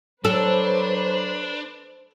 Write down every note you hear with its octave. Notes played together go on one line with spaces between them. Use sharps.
F#3 D4 A4 B4 C5